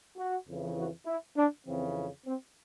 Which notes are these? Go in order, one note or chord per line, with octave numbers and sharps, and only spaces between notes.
F#4
F2 C#3 E3
F#4
E4
D4
F2 C#3 E3 C4
C4